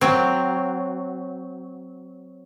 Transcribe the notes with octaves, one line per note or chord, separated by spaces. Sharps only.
F#3 C4